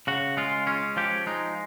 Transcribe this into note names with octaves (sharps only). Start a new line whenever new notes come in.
C#3 F#4
G#3 F4
C#4 F4
F3 G4
G#3 D#4